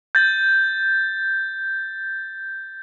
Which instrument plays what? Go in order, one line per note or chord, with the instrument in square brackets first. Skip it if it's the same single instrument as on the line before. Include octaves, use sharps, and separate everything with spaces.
[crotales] G6 A6